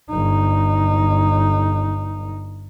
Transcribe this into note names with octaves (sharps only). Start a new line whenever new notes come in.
G1 D#4